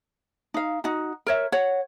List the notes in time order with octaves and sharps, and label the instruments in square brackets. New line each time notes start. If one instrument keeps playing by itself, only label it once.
[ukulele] D#4 F5
D#4 F#4
A#4 C#5 E5
C#5 F#5